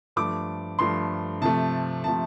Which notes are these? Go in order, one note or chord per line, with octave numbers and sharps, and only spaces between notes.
G2 F3 A3 D6
G2 F3 A3 C6
C3 F3 A3 A5
C3 F3 A3 A5